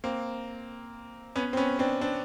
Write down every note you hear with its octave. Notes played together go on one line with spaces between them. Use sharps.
A#3 C4
B3 C#4
C4
B3 C#4
C4 D4
C4 D4